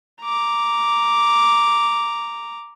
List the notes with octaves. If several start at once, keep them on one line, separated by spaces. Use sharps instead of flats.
A#5 D6